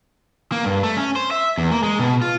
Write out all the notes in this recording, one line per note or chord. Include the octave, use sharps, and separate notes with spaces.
A#3
G2
A3
C#4
C5
E5
E2
A#3
G#3
B2
F4